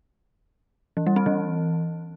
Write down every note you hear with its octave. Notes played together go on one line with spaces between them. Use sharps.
E3
G3
C4
E3